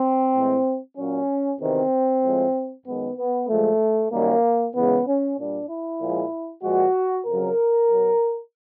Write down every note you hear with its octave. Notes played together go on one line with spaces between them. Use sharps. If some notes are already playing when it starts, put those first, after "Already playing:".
Already playing: C4
A2 E3 G#3
A#2 F#3 C#4
E2 C3 D#3 C4
A2 F3 G#3
F#2 D#3 G#3 B3
B3
A#2 F3 G#3 A3
F#2 D#3 G3 A#3
E2 C#3 E3 G#3 B3
C#4
A#2 G3 D4
E4
A#2 F3 G#3
A#2 F3 G#3 F#4
F2 C#3 F#3 A#4
B2 F#3